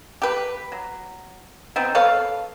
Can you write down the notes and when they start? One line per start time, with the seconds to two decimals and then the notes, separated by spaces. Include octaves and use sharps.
0.22 G4 B4
0.72 F#3
1.76 B3 C4 D#4
1.95 A4 B4 C#5 F5